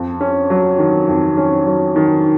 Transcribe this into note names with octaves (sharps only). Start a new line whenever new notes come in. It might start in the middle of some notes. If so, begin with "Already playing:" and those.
Already playing: F2
C#4
F#3
D#3
F2
C#4
F#3
D#3